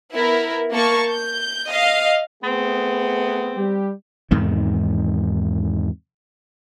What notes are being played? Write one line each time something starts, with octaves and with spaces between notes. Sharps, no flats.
B3 E4 A#4
A#3 A5 C#6
G6
D#5 F5
A3 B3 C4 G#4
G3 G4
E2 G#2 C3 D#3